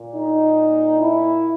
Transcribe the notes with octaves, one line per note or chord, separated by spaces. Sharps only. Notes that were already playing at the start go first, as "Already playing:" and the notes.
Already playing: A#2
D#4
E4